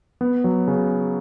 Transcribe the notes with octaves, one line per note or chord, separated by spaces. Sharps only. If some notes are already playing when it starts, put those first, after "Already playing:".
B3
F#3
C#3